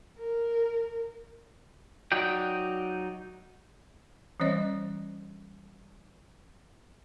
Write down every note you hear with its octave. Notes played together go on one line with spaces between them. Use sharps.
A#4
F#3 D#4 F#4 D5 G5
E3 G3 C#4 C5 C#5 D#5